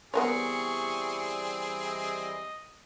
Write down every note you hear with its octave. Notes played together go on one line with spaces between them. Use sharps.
E3 G3 B3 C4 G#4 A#4 C#5 C#6
D#5